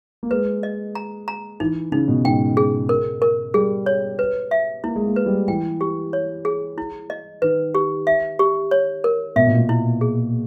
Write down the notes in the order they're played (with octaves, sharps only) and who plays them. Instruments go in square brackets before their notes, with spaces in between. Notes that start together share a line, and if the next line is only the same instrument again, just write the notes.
[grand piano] A#3
[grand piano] G#3 [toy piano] B4
[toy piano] D#5
A#5
A#5
[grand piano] E3 [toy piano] D#4
[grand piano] C#3 [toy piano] D#4
[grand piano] B2
[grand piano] G#2 [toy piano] G5
[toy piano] G#4
A#4
A#4
[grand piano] G3 [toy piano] G#4
[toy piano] C#5
B4
E5
[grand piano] A#3 [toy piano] E4
[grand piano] G#3
A#3
[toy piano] B4
[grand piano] G3
[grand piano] E3 [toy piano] G5
[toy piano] G4
C#5
G#4
E4
D#5
[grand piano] D#3 [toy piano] B4
[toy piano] G4
E5
G4
C#5
A#4
[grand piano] B2 [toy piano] E5
[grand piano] A#2
B2
[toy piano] E4
G#4